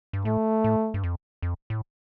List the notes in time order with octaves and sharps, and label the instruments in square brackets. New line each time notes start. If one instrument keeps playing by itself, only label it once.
[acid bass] G2
[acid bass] A2 [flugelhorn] A3
[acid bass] A2
G2
F2
F2
A2